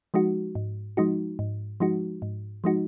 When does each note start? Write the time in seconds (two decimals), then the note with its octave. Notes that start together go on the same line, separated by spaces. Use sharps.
0.14 F3 G#3 D#4 F#4
0.55 G#2
0.97 F3 G#3 D#4 F#4
1.39 G#2
1.80 F3 G#3 D#4 F#4
2.22 G#2
2.64 F3 G#3 D#4 F#4